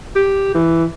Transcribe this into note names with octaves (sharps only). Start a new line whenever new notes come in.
G4
E3